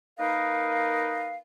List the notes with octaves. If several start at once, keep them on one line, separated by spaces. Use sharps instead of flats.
A#3 D#4 A#4 B4 D#5 F5